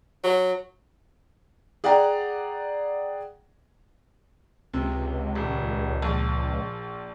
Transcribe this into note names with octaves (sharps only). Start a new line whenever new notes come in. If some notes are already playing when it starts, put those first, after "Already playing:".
F#3
G#4 D5 F#5 G5 A#5
C#2 C3
D#1
A#1